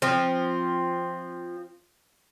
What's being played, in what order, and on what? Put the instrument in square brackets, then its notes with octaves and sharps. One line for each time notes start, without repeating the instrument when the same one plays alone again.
[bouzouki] F3 C4